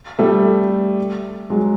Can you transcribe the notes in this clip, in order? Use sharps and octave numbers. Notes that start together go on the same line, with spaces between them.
G3 A3
F#3 G#3